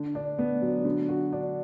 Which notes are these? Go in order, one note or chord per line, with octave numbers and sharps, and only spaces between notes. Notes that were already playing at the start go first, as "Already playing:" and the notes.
Already playing: D3
D4
B3
F#3
D3
F#4
D4